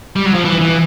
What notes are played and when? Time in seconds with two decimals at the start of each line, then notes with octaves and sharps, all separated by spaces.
0.16 G3
0.26 F#3
0.34 F3
0.45 E3
0.61 E3